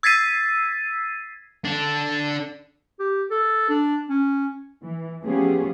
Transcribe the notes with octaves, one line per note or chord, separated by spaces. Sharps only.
E6 G#6 A6 B6 C7 D#7
D4 A4
G4
A4
D4
C#4
E3
F3 A3 B3 C#4 G4 G#4